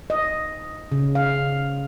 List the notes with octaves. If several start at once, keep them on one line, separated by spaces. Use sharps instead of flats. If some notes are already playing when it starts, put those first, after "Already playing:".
D#5
C#3
F5